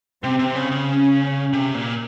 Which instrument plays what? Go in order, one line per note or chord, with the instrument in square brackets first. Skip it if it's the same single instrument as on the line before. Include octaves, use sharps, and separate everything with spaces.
[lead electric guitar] C3 [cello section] C4
[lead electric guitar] C3
C#3
C#3
[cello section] C#4
[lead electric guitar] C3
A#2